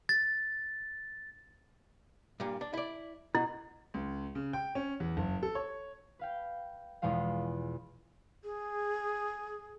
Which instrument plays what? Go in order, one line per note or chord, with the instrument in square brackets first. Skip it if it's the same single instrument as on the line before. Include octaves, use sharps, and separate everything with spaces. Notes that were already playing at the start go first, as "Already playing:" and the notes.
[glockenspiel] A6
[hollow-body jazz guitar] G2 A#2
D4
E4 D5
[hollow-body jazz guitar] B2 [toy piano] E4
[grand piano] C#2
C#3
G5
C#4
E2
F#1
A4
C#5
[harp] B4 F5 G5
E2 B2 F3 G#3 F5
[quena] G#4